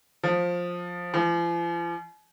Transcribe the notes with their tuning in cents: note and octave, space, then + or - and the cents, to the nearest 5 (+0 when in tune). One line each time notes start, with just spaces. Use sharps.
F3 +15
F3 -40